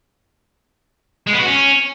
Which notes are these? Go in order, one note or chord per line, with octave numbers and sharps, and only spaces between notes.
G#3
B3
F#4
C#4